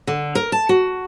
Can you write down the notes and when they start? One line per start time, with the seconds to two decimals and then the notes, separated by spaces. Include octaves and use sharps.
0.07 D3
0.35 A#4
0.52 A5
0.69 F#4